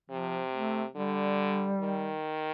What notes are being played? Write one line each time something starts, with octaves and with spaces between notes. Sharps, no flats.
C3 F3
A3
D3 G3
D#3